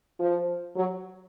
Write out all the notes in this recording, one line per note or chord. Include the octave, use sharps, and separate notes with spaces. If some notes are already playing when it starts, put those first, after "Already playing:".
F3
F#3